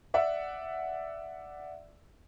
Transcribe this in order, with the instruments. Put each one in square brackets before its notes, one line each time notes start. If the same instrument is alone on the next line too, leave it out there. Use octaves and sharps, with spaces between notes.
[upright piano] D5 E5 F#5